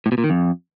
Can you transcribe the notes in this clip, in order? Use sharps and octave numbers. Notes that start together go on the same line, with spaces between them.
A2
B2
A#2
D#3
F2